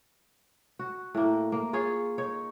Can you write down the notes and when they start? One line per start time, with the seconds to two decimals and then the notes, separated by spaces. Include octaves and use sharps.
0.79 F#4
1.15 A2 A#3
1.52 A#3
1.73 F4 G#4 C#5
2.18 D#4 C#5